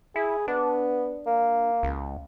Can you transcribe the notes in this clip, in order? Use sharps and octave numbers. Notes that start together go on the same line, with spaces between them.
E4 G#4
B3 D4
A#3
C#2